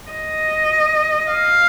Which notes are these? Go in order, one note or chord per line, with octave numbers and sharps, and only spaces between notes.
D#5
F5